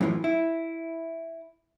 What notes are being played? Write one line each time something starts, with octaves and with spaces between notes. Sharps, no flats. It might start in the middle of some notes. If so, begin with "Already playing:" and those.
F#2 A2 E3 F3
E4